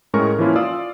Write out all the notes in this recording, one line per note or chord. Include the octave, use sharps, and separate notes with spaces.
A2 G#3 C#4 A#4 C#6
E3 F3 A#3 C#4 E4 F4
F4 D5 F5 D#6 E6